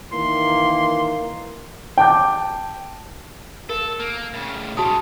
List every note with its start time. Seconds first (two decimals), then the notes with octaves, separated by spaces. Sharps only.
0.12 D#3 E3 A#3 C6
1.98 G5 A5 D6 G6
3.69 A4 A#4
4.00 A#3
4.34 A2 C#3
4.77 B2 C#4 F#4 A5 D#6